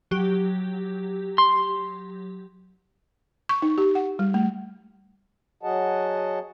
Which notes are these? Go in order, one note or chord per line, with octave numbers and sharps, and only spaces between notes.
F#3 G4
C6
C#6
D#4
G4
F#5
G3
A3
F#3 F#4 G#4 D#5 F#5 A5